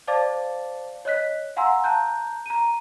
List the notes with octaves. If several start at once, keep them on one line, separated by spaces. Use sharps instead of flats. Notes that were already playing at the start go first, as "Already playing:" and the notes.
C5 D5 F5 A5 D6 A6
C#5 D#5 F#6 B6
F5 F#5 G#5 A#5 C6 E6
A5 A#5 F#6 G6
A#5 D#7